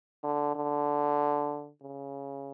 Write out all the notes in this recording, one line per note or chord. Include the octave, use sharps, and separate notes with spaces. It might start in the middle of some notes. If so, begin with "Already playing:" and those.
D3
D3
C#3